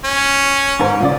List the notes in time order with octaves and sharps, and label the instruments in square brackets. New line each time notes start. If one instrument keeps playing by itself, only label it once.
[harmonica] C#4
[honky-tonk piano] G#2 A#4 C5
A#2 C#3 D5